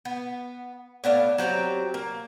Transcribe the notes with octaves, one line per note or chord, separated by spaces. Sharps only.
B3
A2 B3 D4 F5
F#3 C4 G4 A#5
A#3